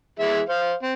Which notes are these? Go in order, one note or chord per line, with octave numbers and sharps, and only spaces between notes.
E3 G#3 E5
C5 F5
C4